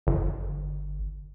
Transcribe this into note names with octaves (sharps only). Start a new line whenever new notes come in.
G1